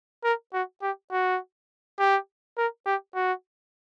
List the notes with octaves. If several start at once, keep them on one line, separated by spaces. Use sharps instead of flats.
A#4
F#4
G4
F#4
G4
A#4
G4
F#4